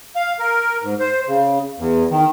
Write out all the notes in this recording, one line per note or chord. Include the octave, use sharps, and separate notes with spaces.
F5
A#4
G#2
C5
C#3
E2
D#3